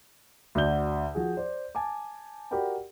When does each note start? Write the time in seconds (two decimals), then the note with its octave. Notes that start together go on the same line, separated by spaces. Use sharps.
0.55 D2 D4 F#4 D5 G6 G7
1.15 F3 F#4 G#4
1.37 C5 D5
1.75 G#5 A5 D6
2.51 F#4 G4 A#4 D5 G5 B5